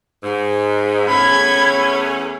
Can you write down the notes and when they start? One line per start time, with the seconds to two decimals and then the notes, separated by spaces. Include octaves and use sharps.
0.22 G#2
1.08 E2 A3 C#4 B5 G#6